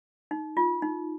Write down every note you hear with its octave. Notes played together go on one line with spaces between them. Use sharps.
D#4
F4
D#4